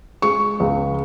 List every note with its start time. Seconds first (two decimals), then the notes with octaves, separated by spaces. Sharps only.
0.22 G#3 C#6
0.60 C#2